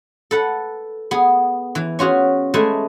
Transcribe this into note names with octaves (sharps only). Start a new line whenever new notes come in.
A4 B4 F#5
B3 G#4
E3
C#4 F4 F#4 G#4
G#3 A3 G#4 B4 E5 G#5